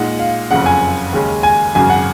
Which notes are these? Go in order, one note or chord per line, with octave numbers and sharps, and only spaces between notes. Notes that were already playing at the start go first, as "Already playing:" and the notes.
Already playing: A#2 G#3 D#4 F#5
F5
F#1 F2 C#3 F#5
G#5
D#2 C#3 G#3 C#4
G#5
G#1 F#2 C#3 G#5
F#5